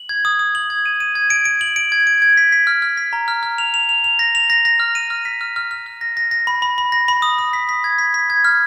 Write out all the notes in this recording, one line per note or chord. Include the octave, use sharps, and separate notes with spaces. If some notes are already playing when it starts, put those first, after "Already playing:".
Already playing: F#7
G#6
D#6
D#6
F#7
G#6
D#7
D#7
G#6
D7
D7
F#7
D7
G#6
D7
G#6
B6
B6
F6
F6
B6
A#5
F6
F6
F7
F7
F7
F7
A#6
F7
A#6
A#6
F6
D#7
F6
B6
F6
F6
F6
F6
A#6
A#6
A#6
B5
B5
B5
A#6
B5
D#6
D#6
B6
B6
G#6
B6
B6
G#6
F6